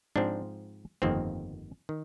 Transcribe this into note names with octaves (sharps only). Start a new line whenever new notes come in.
G#2 F3 C4 D4
G1 F2 D#3 A#3 C4
D#3